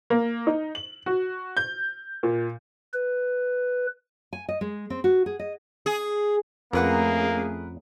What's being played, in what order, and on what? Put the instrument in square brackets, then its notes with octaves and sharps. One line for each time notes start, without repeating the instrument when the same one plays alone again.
[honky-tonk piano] A#3
D#4
F#7
F#4
G6
A#2
[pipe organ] B4
[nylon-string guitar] G#5
D#5
G#3
C4
F#4
G#4
D#5
[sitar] G#4
[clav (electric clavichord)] F2 [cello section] A3 C#4 G#4 [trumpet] A#3 [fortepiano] A#4 B4 F#5